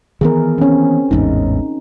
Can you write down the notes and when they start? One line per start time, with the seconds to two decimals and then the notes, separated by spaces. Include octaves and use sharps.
0.21 D#3 E3 B3 G#4 A#4
0.58 C4 C#4
1.11 A1 E2 G#2 D#4